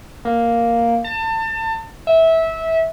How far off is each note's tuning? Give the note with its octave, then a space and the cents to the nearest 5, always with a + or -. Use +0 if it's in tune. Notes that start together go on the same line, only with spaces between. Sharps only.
A#3 +0
A5 +30
E5 -20